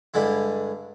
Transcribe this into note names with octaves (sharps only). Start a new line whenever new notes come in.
G2 D3 G#3 E4